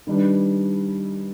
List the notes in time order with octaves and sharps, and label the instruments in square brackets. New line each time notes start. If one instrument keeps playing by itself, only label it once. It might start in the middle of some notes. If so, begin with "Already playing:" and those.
[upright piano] D#3 G3 D4 G4 B4